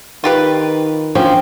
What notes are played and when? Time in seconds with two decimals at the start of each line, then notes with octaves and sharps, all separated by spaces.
0.24 D#3 F4 G4 B4
1.15 F3 C#4 D4 G5